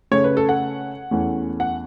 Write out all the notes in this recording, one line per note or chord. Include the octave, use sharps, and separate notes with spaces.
C#3 A3 C#4 C#5
B4
A4
F#5
E2 E3 A3 C#4
F#5